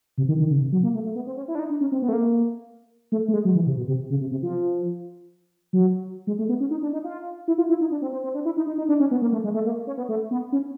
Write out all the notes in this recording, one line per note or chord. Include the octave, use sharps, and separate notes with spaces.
C3
D#3
D#3
C#3
C3
F#3
A#3
A3
A3
B3
C4
C#4
E4
D4
D#4
D4
C#4
C4
B3
A3
A#3
A3
A3
G#3
F#3
E3
C3
B2
C3
C#3
C3
C3
F3
F#3
G#3
A3
B3
C#4
D#4
D4
D#4
F4
E4
F4
E4
D#4
D4
C4
C4
C4
D4
E4
D#4
D#4
D#4
D4
C#4
B3
A#3
A3
G#3
A3
A#3
C#4
B3
A3
B3
C#4